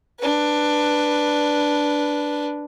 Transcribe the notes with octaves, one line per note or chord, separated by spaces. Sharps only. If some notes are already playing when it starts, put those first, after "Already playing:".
D4 B4